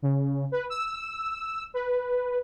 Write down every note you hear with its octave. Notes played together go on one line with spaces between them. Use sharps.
C#3
B4
E6
B4